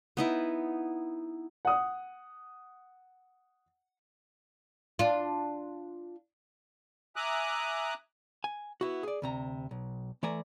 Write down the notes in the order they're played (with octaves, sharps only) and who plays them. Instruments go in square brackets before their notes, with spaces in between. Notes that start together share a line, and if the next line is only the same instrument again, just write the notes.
[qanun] B3 D#4 E4
[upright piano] F#5 D#6
[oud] D4 F4
[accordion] E5 G#5 A#5 D6 D#6 F#6
[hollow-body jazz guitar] G#5
B3 E4 F#4
G#4 D5
D2 C3 A#5
B1
E3 A3 D5 G#5 A#5